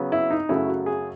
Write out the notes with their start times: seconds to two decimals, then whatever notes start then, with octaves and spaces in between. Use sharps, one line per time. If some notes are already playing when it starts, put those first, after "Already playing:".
Already playing: C#3 F#3 B3
0.12 E4
0.30 D#4
0.49 F#2 C#3 F#3 A3 E4
0.68 F#4
0.86 G#4